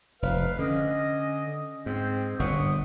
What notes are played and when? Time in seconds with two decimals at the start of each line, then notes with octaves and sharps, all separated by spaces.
0.22 F1 B4 F5
0.59 D3 C#4 D#5
1.86 G#2 C4
2.39 G1 A#2 F#5 C#6 D#6